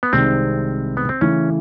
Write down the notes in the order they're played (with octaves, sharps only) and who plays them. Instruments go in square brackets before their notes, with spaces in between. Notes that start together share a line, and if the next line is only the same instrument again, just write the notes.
[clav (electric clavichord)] B3
[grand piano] C2 C3 D#3 G#3 [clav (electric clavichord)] C4
[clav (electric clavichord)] B3
C4
[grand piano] C#3 E3 A3 [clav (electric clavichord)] C#4